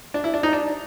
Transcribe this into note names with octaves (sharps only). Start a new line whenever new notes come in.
D4
E4
D4
D#4
D4